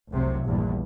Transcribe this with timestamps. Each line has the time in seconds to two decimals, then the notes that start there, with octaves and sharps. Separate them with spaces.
0.11 F1 C2 C3 F#3
0.45 A#1 E2 G2